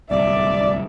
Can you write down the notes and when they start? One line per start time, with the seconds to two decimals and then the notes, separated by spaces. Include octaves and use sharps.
0.11 D1 C2 D5 E5